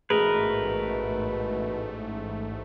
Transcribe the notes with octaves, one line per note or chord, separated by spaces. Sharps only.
A1 G#2 B2 A3 G#4 A#4 B4